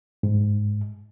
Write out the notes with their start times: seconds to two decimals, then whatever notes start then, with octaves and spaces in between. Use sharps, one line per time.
0.23 G#2